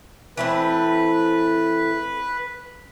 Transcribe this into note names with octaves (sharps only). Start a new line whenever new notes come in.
E3 A3 C4 B4